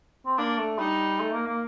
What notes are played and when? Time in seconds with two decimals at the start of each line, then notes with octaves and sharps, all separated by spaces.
0.26 C4
0.38 A#3 D4
0.58 A3
0.78 G3 D#4
1.20 A3
1.33 A#3
1.47 A#3